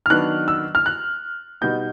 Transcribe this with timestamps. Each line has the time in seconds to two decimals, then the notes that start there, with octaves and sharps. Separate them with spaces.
0.06 F6
0.10 D#3 F#3 B3 D4 F#6
0.48 E6
0.75 F6
0.86 F#6
1.61 B2 G3 B3 D#4 G6